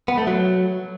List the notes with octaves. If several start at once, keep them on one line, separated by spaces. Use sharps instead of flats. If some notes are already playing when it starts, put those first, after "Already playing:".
B3
A3
F#3